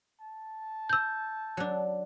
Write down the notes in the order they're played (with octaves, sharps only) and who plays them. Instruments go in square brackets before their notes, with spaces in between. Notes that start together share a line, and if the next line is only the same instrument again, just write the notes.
[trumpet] A5
[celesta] E6 G6
[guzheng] F#3 D4